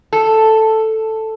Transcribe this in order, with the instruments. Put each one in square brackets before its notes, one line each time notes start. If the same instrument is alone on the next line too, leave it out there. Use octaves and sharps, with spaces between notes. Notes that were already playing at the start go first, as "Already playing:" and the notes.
[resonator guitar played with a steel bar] A4